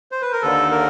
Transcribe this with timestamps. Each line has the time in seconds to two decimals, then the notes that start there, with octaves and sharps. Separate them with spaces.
0.12 C5
0.22 B4
0.32 A#4
0.42 D#2 D3 A4
0.71 A#4